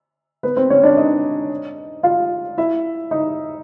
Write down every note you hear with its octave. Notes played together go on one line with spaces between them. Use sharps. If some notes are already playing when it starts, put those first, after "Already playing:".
B3 B4
C4 C5
C#4 C#5
D4 D5
D#4 D#5
F4 F5
E4 E5
D#4 D#5